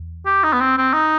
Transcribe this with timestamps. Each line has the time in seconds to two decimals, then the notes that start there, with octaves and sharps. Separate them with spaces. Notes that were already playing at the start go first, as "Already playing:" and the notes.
Already playing: E2
0.26 G4
0.43 D#4
0.53 B3
0.60 C4
0.78 C4
0.93 D#4